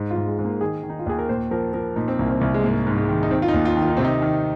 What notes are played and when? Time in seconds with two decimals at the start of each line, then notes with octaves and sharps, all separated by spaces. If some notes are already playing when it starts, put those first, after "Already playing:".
Already playing: G#2
0.11 F4
0.16 G#2
0.27 G#3
0.39 G#2
0.44 A#3
0.61 D#3 G#4
0.83 D#3
0.90 D#4
0.99 F4
1.06 D#2 G#4
1.19 A#4
1.29 A#2 C5
1.51 F3 A#4
1.74 F3 A#4
1.96 A#2 D#4
2.08 C4
2.19 C2 A#3
2.30 C4
2.41 C2
2.54 G#3
2.64 G#2 A#3
2.87 G#2
2.98 G#3
3.09 D#3
3.23 D#4
3.31 D#3 C4
3.42 F4
3.48 D#4
3.54 D#2
3.65 F4
3.77 D#3
3.82 F4
3.89 D#4
3.97 C3 C4
4.04 D#4
4.22 D#3